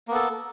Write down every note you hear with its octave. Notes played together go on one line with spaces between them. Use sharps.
A#3 B3 A4